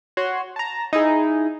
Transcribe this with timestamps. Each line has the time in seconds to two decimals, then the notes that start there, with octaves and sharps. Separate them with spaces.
0.17 F#4 C#5 C6
0.56 A5 A#5
0.93 D#4 E4 G#4